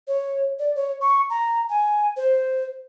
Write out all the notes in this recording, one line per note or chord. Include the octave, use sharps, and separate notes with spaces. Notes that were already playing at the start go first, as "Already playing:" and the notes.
C#5
D5
C#5
C#6
A#5
G#5
C5